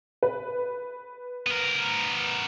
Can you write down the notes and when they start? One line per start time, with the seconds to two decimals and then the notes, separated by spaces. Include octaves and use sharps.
0.23 B4
1.47 B3 A#4